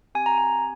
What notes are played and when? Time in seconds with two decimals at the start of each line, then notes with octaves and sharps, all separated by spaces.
0.15 C4 G4 G#5
0.26 A#5
0.38 G#5